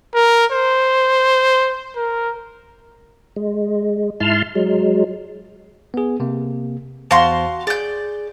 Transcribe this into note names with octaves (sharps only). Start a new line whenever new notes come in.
A#4
C5
A#4
G#3
G#2 E4 A5 C6 F6
F#3 G#3
B3 G#4
C3 A#3
E2 F#4 C5 F5 A5 C6
G#4 D5 G6